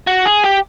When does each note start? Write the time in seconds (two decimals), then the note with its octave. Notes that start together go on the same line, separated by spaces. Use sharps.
0.07 F#4
0.25 G#4
0.44 G4